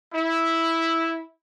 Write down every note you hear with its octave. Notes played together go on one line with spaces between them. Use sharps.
E4